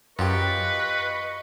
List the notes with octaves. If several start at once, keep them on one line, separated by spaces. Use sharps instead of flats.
F#2 F4 G4 B4 D#5 C#6